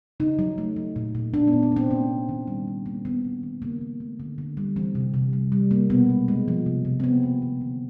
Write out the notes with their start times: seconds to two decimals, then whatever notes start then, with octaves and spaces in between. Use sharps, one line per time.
0.20 C#3 D#4
0.39 F#3
0.58 A3
0.76 F#3
0.96 A#2
1.15 A#2
1.34 A#2 D4
1.48 B3
1.53 A#2
1.63 B3
1.72 A#2 C4
1.91 A#3 C#4
2.09 A#3
2.29 D#3
2.48 G3
2.67 G3
2.86 A#3
3.05 D#3 B3
3.24 D#3
3.43 D#3
3.62 C#3 A#3
3.81 C#3
4.00 A3
4.20 D3
4.38 D3
4.57 G3
4.76 E3 C4
4.95 C3
5.14 C3
5.33 G3
5.52 G3
5.71 A#3
5.90 B2 B3
6.09 G#3
6.28 G#3
6.48 F3
6.66 C3
6.85 C3
7.00 C4
7.04 A#3 B3
7.23 A#3
7.42 D#3
7.61 D3